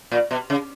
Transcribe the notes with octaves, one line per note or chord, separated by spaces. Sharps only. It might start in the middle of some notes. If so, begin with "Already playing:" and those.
A#2
B2
C#3